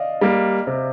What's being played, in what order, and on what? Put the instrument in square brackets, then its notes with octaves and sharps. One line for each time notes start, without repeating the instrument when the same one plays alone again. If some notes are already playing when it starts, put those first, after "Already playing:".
Already playing: [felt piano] D5 D#5 F5
[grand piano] G3 A#3
C3